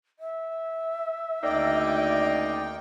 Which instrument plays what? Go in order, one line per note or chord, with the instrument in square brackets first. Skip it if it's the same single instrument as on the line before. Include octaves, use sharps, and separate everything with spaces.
[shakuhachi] E5
[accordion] D2 G5 [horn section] C#3 A#3 D#4 [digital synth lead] D5